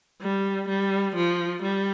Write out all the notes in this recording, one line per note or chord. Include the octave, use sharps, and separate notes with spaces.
G3
G3
F3
G3